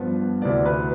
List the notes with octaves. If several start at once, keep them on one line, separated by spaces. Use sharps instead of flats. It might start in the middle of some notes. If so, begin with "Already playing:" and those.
Already playing: G2 F3 B3
D2 C3 E3 D5
B4